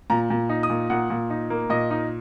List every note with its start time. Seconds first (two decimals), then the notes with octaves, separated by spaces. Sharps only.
0.10 A#2 A#5
0.30 A#2
0.49 D#4
0.63 D#6
0.70 A#2
0.90 A#2 F#5
1.10 A#2
1.30 D#4
1.50 A#3
1.70 A#2 D#5
1.91 D#4